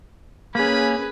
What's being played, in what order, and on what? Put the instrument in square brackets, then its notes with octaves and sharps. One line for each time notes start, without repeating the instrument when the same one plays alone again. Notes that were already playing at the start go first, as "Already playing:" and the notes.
[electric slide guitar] A#3 C#4 [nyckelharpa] G#4 B4 [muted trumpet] B5